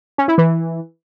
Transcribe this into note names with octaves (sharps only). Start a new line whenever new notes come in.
C#4
E4
E3